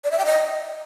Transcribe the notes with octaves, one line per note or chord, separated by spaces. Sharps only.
D5
E5
G5
D#5